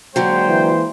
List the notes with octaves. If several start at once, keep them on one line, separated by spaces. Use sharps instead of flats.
D3 F#3 G#3 A#3 C5 G5
E3